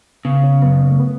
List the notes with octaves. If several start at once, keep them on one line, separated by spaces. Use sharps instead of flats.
C#3 B3
C#4
F#2 B3
A3
B3